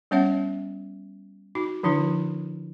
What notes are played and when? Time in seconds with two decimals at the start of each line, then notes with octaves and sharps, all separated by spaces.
0.11 G3 B3 C#4 C#5 E5 F#5
1.55 D#4 F#4
1.83 D3 F3 D4 E4 B4